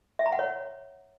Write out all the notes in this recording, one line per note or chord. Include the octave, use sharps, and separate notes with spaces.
E5
A#5
F#5
C#5